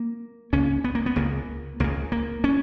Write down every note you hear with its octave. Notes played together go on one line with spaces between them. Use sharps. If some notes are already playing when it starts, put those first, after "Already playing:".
Already playing: A#3
C#2 C#3 C#4
B3
A#3
B3
C#2 C#3 A#3
C#2 C#3 A#3
A#3
C#4